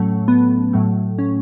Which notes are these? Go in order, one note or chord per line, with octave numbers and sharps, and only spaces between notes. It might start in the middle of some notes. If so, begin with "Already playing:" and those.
Already playing: A2 F#3 A3 C#4
B3
A2 F#3 A3
C#4